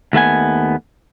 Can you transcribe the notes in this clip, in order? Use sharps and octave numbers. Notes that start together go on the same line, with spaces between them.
D#2 A3 B3 G#5